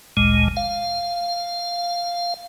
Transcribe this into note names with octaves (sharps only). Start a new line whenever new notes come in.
G#1 D2 A#2 G#3
F5